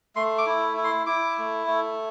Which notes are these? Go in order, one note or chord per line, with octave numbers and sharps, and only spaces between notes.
A3 C6
D6
E4
E4
C6
E4 D6
A3
A3